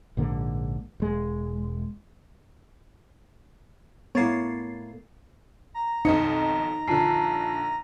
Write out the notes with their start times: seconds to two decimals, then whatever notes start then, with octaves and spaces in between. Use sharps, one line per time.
0.17 A#1 G#2 D3 A#3
1.00 E1 G#3
4.15 A2 A#3 B3 C#5 A6 C7
5.74 A#5
6.05 B1 F2 D#4 D#5 C#7
6.88 A#1 D3 F4 A5 C7